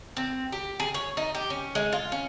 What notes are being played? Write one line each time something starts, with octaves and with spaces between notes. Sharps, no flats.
C4
G4
G#4
C#5
D#4
G4
C#4
G#3
F4
C#4